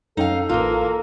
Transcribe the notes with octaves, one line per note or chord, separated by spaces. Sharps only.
F#2 C#4 D#4 A4 F5 G5
A1 E3 A#3 F4 F6